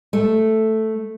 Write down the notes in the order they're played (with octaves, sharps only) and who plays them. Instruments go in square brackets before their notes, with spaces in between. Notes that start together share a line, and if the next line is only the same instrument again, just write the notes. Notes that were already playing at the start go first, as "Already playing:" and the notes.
[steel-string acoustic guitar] A3